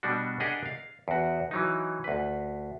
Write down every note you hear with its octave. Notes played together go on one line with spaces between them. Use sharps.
B2 G3 D4 F#4
D4 G4 G#4 A#4 D#5 F#5
F5
E2 F#4
E3 F#3 D#4
D2 B4